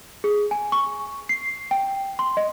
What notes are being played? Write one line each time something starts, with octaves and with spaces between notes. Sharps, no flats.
G#4
G#5
C#6
C7
G5
C6
D#5